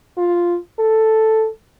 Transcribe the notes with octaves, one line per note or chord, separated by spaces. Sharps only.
F4
A4